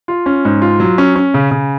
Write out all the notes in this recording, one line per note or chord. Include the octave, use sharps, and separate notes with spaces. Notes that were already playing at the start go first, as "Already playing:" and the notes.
F4
C#4
G#2
F4
F#3
C#4
C#4
C#3
C#3